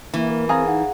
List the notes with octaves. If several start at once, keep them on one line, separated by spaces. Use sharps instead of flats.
E3 A#3
A#4
C4 G#4 F5 A#5
D#4 F#5